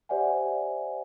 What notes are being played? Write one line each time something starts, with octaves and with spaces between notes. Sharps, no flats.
G4 C5 D5 E5 F#5 G#5